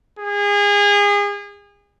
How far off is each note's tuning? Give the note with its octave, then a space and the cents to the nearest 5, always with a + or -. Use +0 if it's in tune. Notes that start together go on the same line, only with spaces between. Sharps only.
G#4 -30